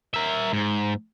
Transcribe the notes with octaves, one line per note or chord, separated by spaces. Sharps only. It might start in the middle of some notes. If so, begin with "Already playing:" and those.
A#4 E5
G#2